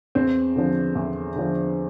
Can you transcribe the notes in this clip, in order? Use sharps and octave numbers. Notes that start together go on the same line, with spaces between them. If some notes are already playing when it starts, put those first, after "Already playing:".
E2 C4
D3 F3
E2
D3 F3